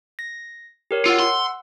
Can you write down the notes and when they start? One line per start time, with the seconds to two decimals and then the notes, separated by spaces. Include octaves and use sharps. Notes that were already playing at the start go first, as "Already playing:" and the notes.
0.19 A#6
0.91 G4 A#4 C#5
1.06 F4 F#5 E6
1.20 C6